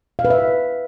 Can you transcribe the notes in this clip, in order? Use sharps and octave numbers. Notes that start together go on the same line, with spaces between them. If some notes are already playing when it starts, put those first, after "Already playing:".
F5
B4
E5